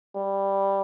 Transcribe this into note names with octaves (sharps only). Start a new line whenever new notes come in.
G3